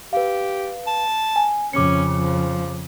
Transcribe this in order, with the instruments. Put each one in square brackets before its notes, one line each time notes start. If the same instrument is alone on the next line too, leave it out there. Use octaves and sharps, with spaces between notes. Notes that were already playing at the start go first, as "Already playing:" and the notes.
[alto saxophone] G4 [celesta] B4 F5
[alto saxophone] A5
[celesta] G#5
[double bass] F2 C#3 [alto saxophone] C#4 [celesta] D6 C#7
[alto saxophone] F3